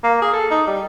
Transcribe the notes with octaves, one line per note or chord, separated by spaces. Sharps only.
A#3
G#4
A4
D#4
G3